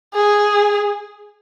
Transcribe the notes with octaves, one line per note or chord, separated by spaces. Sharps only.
G#4